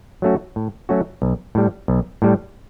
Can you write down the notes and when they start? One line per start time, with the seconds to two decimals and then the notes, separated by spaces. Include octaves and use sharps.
0.22 F#3 A3 C#4 F#4
0.56 A2
0.89 F#3 A3 C#4 F#4
1.22 B1
1.55 A2 G3
1.88 B1
2.22 A2 G3